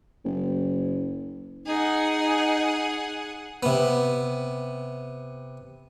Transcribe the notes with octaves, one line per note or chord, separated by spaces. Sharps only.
F#1
D#4 G#4 F#5
C3 B3